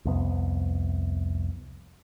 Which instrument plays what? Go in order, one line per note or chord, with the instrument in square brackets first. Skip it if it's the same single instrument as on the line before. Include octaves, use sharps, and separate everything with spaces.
[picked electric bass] C2 F2 B3